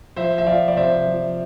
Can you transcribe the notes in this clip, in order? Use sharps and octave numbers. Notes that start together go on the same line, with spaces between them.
F3 C5 E5
E5
F3 D5 F5
D5
C3 C5 E5
F3